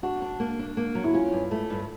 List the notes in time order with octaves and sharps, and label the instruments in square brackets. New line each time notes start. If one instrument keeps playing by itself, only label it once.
[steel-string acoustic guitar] D4 [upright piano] F#4
[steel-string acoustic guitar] D4
A#3
D4
A#3
F#3
[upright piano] E4
[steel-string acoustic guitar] C#4 [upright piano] F4
[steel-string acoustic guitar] G2
A3
G2